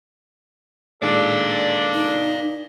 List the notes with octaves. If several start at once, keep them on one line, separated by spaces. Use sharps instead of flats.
A#2 D#3 G#3 D4 A4 D5 F5
D#4